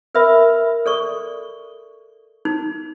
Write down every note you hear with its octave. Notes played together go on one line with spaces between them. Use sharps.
A#4 B4 E5 B5
A4 D5 C#6
D#4